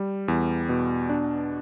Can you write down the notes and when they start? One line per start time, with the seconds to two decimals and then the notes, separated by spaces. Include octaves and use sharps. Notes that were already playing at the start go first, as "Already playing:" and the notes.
Already playing: G3
0.28 E2
0.69 B2
1.09 D4